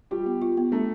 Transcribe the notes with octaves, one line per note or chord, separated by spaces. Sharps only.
G3 F4 G4
B3
F4
B3
A3 D4 A4